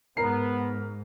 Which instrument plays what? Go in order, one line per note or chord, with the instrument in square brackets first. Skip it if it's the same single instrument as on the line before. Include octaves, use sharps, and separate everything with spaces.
[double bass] G#2 [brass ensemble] B3 [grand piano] A#4 A#5 C7